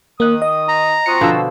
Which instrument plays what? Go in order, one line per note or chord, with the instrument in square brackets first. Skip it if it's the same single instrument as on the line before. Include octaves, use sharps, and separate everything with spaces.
[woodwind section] D#3 D#6 [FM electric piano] A#3 F#6
[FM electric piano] D#5
[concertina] A#5
[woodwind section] C4 F4 F#4 [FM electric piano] D#6 C#7
[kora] B2 D3 F3 [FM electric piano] C6 E6